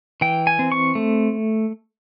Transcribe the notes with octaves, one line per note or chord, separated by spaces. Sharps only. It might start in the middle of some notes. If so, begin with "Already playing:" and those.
E3 G5
G#5
C4
C#6
A3